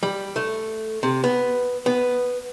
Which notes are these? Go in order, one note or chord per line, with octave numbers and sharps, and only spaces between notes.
G3
A3
C3
B3
B3